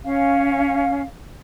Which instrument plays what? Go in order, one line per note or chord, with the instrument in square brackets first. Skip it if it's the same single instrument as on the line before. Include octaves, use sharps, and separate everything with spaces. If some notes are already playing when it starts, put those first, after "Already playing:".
[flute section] C#4 F5